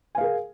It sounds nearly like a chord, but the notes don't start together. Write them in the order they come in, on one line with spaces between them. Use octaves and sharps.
G#5 F5 G#4 A#4